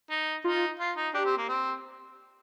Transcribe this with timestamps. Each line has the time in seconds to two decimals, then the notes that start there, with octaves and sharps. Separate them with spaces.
0.10 D#4
0.44 D#4 F4
0.79 F4
0.97 D#4
1.14 D4 G4
1.26 C4
1.37 A#3
1.49 C4